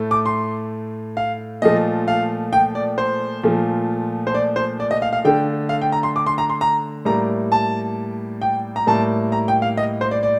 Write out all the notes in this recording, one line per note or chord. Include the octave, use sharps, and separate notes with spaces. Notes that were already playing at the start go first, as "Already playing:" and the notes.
Already playing: A2 A3
D6
C6
F5
A#2 F3 A3 D#5
F5
G5
D5
C5
A#2 F3 A3
C5
D5
C5
D5
D#5
F5
F5
D3 A3 G5
F5
G5
A#5
C6
D6
C6
A#5
C6
A#5
A2 G3 A#3 A#5
A5
G5
A#5
A2 G3 A#3 A5
A#5
G5
F5
D#5
C5
D5
D5